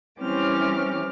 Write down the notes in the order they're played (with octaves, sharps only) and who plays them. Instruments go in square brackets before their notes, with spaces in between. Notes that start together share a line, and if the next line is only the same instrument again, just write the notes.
[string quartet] E3 G3 C4 C#4 D6 F6